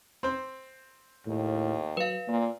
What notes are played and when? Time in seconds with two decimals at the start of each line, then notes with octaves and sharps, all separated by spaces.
0.23 C4 C5
1.26 D#2 A2
1.97 F#3 B4 F5
2.28 A#2 A#3